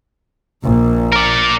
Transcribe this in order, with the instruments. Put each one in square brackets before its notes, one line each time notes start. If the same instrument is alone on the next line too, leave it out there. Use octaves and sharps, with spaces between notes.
[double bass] A#1 A#2
[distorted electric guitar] A#4 D5